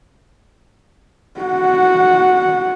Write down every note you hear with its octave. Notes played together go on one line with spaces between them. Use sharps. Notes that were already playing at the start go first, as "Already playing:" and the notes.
F#4 F#5